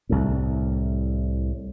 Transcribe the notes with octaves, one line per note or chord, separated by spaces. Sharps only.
C2 A2